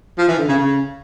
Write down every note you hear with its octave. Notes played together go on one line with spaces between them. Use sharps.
F3
E3
D3
C#3
C#3